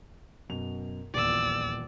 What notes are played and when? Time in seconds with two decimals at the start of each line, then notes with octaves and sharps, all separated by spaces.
0.49 F#2 B2 F7
1.14 D#1 A#1 E2 D5 E6